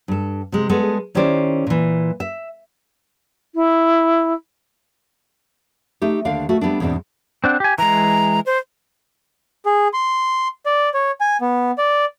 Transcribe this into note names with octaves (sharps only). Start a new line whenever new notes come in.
G2 A4
C3 G#3
G3 G#3 B3 G#4 A4
D#3 C#4 E4 G4 C5 D5
A#2 E3
E5
E4
A3 D#4 G4
D#2 D3 D4 F5
A3 F#4
G3 B3 C4 D4
E2 G#2 B2 C4 D4
C4 D4 F#5
G4 G#5
E3 G#3 A#5
C5
G#4
C6
D5
C#5
G#5
B3
D5